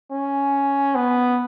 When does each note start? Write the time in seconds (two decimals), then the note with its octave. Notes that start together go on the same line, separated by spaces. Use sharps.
0.12 C#4
0.95 B3